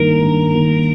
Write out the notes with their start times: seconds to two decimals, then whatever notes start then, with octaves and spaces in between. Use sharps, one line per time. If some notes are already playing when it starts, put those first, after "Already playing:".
Already playing: G2 D#3 A#3 A#4
0.22 G2
0.54 D#3 A#3